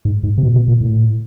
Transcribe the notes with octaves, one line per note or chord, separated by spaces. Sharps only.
G#2
G#2
C3
B2
B2
A#2
A2